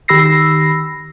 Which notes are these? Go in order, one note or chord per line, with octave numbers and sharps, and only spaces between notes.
D#3 G4 B5 E6 A#6 C7